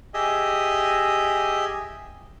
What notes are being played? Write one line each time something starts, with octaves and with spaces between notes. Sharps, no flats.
G4 G#4 D#5 E5